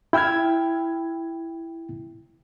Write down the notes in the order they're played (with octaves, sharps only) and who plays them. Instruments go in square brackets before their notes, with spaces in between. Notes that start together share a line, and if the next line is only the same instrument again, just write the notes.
[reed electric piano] E4 G5 E6 F6 G#6